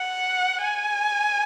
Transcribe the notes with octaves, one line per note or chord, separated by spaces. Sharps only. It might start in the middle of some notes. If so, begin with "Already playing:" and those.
Already playing: F#5
G#5